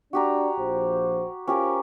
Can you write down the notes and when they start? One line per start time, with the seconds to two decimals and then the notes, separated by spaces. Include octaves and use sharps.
0.13 D4 F#4 G4 A#5
0.58 A#1 F3 C5
1.47 C#4 F4 G4 A#4 C5